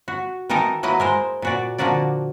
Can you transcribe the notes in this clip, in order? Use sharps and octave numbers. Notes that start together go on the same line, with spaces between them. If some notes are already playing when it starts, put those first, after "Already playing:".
F#4
D#3 E3 D#4 A4 A#4
F#3 A#3 E4 B4 D#5
G#3 A#4 C5
A#2 F#4 D5
D3 F3 A#3 F#4 D5